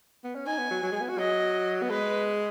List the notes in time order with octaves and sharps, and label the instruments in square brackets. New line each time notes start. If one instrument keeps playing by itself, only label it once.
[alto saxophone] B3
C#4
[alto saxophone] D#4 [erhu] G#5
[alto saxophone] B3
F#3
F#3
G#3
B3
F#4
[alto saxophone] F#3 [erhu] D#5
[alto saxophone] B3
[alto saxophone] G#3 [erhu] B4